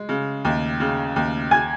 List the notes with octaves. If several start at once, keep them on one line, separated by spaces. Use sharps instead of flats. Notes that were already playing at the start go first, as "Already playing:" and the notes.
Already playing: G#3
C#3
D#2
C#3
D#2
G#5 G#6